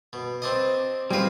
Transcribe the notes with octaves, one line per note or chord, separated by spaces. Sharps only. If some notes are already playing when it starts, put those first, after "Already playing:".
B2
C4 D4 D#5
G3 G#3 C4 F4 B4